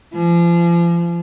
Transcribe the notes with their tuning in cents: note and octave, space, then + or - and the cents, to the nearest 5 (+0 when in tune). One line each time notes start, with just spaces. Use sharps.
F3 -35